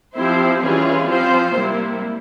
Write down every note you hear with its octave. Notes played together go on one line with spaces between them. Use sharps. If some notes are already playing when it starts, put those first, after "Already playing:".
F3 C4 E4 G4 C5
E3 G3 C#4 F4 G#4
F3 C4 F4 C5
C3 G3 A#3 E4